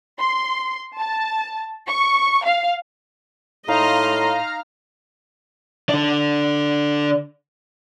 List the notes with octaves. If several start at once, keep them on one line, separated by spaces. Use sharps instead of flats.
C6
A5
C#6
F5
A2 D#4 D#5 F5 A#5 C6 F6
D3 D4